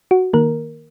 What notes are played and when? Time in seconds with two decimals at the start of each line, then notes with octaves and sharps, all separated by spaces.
0.11 F#4
0.33 D#3 A#3 A#4